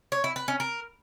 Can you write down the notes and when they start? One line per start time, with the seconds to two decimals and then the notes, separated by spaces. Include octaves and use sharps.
0.12 C#5
0.24 E4
0.36 B4
0.48 C#4
0.60 A#4